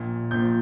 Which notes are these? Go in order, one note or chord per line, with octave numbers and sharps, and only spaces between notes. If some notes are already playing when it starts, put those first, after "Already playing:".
Already playing: A#1 A#2
A#1 A#2 G6